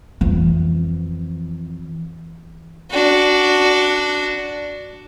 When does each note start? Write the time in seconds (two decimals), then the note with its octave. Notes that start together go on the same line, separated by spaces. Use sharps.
0.21 F2 E3
2.91 D4 F#4